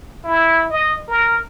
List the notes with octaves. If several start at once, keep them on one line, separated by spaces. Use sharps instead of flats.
E4
D#5
A#4